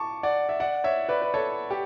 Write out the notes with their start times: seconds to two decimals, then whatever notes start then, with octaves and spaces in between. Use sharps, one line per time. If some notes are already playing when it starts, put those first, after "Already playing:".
Already playing: A5 C#6 D6
0.23 D5 F#5
0.49 E5
0.60 D5 F#5
0.84 C#5 E5
1.09 B4 D5
1.22 B4
1.34 A4 C#5
1.71 G4